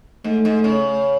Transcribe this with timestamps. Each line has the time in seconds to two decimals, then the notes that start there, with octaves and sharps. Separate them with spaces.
0.24 G#2 A3
0.45 G#2
0.64 C#3